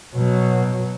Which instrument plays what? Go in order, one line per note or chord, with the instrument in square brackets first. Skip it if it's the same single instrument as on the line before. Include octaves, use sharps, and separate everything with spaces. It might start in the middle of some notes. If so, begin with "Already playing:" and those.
[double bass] B2 F#3